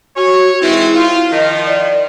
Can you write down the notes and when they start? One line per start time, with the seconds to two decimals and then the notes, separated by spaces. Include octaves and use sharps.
0.17 F#4 C#5
0.61 G#2 E3 C4 E4
0.95 F4
1.32 D#3 F3 D#5
1.66 D5